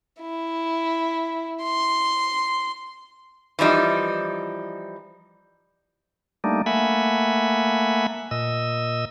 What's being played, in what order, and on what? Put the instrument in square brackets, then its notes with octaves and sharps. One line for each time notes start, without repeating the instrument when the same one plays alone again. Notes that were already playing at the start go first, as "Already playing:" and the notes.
[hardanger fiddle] E4
C6
[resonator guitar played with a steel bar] E3 F3 G3 D#4
[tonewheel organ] G3 A3 A#3 D4 D#4
A3 A#3 E5 F#5 G#5 B5
A#2 D#5 E6